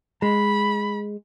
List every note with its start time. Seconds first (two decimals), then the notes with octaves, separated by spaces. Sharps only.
0.22 G#3 B5